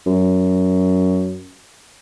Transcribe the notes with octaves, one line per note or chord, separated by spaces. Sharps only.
F#2